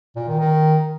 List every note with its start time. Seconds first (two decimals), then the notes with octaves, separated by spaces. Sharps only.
0.16 A#2
0.28 D#3
0.39 D#3